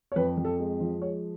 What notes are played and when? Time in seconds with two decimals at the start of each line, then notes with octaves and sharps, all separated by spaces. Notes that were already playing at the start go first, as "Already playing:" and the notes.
0.12 C#5
0.16 F2 B4
0.37 F2
0.45 A4
0.59 G#3
0.80 F3
1.02 G#3 C#5